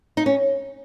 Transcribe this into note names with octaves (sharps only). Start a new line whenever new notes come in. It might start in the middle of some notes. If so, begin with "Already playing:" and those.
D#4
C#4